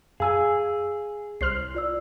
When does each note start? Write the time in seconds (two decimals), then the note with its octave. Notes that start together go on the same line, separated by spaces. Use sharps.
0.20 F#2 G#4 F5 G#5 E6
1.41 C2 C5 F6 C7
1.75 F4 D5 E6